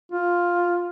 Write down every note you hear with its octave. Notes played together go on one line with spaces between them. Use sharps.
F4